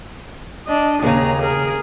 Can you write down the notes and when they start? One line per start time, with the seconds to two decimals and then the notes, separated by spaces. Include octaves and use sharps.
0.67 D4 D#5
1.02 D#2 C#3 G#4 A#5
1.41 G#4 A#4